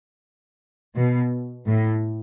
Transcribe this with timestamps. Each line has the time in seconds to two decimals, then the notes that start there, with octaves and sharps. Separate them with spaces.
0.96 B2
1.67 A2